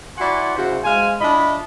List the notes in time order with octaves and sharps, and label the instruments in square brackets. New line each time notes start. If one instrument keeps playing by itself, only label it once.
[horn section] E4 F#4 D5 F#5 G#5 C6
C#3 E4 F#4 C5
G#3 C5 F5 G#5
D4 E4 F4 D#5 B5